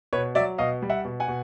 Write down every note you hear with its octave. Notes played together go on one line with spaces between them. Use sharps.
B2 B4 C#5
F#3 D5 E5
B2 D#5 F5
G3
E5 F#5
B2
F#5 G#5
B2